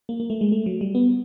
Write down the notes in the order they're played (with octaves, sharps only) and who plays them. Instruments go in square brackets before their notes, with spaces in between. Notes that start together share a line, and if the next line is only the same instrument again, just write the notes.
[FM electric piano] A#3
A#3
A3
G#3
A3
F#3
G3
B3